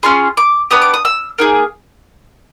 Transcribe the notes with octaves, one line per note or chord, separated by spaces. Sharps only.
C#4 F4 G#4 C6
D6
B3 D4 G4 D#6
D6
D#6
E6
A#3 D#4 G#4